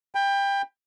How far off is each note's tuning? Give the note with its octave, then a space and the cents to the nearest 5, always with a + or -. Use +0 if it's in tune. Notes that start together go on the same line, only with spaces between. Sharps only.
G5 +25 B5 +0